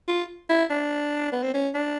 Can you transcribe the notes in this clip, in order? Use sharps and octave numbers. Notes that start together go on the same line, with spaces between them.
F4
E4
D4
B3
C4
C#4
D4